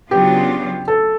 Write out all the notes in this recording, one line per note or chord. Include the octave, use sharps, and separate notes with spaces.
C#3 F#3 B3 D4 F4 G4
A4